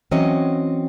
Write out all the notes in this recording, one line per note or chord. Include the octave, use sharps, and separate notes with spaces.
E3 F#3 C4 C#4 D#5